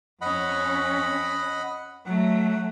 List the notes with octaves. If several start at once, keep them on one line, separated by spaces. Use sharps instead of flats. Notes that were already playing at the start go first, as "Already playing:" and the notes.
F2 C#4 D#5 F#5 B5
F#3 A3 F#5